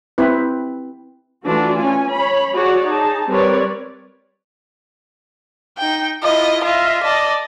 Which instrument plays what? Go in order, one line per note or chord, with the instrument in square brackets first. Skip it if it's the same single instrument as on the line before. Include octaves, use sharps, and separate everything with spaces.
[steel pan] C4 E4 B4
[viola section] E3 A3 D4 F4 F#4
C#4 G#5
C#5 B5
F#4 G#4 C#5 D5 F#5
D#4 G#4 A5
G3 C4 A#4 B4 C#5 D5
[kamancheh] D#4 G5
[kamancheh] E4 F4 [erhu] D#5
[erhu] F4 [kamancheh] D#5 E5
[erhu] D5 [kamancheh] D#5 A5